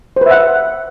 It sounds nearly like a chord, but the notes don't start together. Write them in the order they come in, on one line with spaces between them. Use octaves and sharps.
C5 B4 E5 F#5